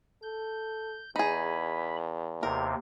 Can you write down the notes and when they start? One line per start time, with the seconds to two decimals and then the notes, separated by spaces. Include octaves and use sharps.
0.23 A4 G6
1.16 E2 D#4 G#4 B5
2.43 D#2 C3 A#4